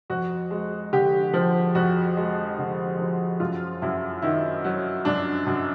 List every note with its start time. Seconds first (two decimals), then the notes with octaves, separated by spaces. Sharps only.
0.10 F2 F#4
0.51 G#3
0.93 D3 G4
1.33 F3
1.75 F2 F#4
2.17 G#3
2.58 D3
2.98 F3
3.40 F#2 F4
3.82 F#2 E4
4.22 D#3 E4
4.64 F#3
5.05 F#2 D4
5.46 F#2